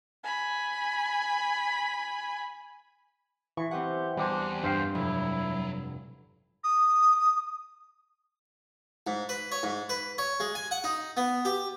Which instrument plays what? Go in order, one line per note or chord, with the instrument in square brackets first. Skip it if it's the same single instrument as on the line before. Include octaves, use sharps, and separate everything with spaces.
[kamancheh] G#5 B5
[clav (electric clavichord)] E3 [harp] C#6
[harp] C4 B4 F#5 [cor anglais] G4
[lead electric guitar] E2 G#5 [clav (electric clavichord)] G3 G4 C5 [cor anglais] D4
[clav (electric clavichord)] G2 F5 G5 [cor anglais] C5
[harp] F1 [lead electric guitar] F#3 [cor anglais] E4
[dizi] D#6
[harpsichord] G#2
B4
C#5
G#2
B4
C#5
G#3
G#5
F#5
D#4
B3
G4